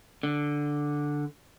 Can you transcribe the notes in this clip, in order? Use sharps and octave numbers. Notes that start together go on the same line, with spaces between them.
D3